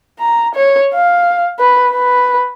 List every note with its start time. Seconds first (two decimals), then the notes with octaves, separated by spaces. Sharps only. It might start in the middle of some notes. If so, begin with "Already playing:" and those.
0.20 A#5
0.55 C#5
0.94 F5
1.59 B4
1.91 B4